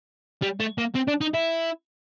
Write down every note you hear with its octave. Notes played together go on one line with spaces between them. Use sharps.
G3
A3
A#3
C4
D4
D#4
E4